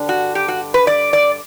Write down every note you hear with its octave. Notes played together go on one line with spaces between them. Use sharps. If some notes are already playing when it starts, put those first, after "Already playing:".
Already playing: G2 D3 G3 D4
F#4
G4
F#4
B4
D5
D5